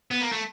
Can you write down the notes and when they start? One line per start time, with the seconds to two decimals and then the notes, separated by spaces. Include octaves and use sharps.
0.11 B3
0.21 A#3
0.32 A3